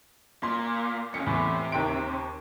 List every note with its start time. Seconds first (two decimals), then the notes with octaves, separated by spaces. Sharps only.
0.43 A#2 C6
1.14 F2 C#3 C#7
1.26 E2 A2 C3 E3
1.72 D#2 G5 D7